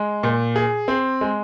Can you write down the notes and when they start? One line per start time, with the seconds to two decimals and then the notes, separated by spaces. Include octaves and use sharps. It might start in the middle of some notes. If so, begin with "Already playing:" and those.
Already playing: G#3
0.23 A#2
0.56 G#4
0.88 C4
1.21 G#3